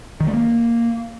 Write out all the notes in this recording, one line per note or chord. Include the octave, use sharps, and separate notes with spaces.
D#3
A3
A#3